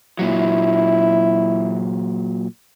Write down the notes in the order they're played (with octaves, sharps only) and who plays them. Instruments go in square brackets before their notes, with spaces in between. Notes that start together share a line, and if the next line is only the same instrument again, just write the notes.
[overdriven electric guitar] A#2 F#3 [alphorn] E4